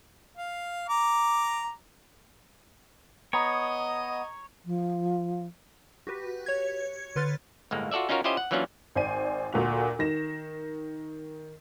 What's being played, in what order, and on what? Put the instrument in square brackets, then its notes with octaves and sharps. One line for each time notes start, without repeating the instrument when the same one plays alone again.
[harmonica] F5
A#5 D6
[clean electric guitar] B3 [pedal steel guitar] C#5 [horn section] D#5 [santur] A#5
[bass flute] F3
[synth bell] F#4 G4 B4
C#5 G#6
D3 B4 C6 F6 A6
[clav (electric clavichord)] G1 A2 G#3 A#3
F4 F#4 A4 D5 E5
C#4 D#4 F4 F#4 A#4 C#5
C#4 E4 F4 G4 C5 D#5
F#5
E3 F#3 A#3 C#4 D4 F4
[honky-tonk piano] G#1 C5 D5 G#5 D#7
D2 A#2 F#4 F7
D#3 A#6 E7